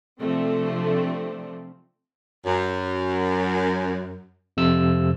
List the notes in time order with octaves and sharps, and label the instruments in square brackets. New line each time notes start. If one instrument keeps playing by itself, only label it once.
[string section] C3 F3 A3 C4 D4
[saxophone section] F#2
[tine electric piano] F2 C3 E6